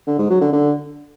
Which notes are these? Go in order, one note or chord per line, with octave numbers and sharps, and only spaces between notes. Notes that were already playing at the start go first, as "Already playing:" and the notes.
D3
G#2
F#3
D3
D3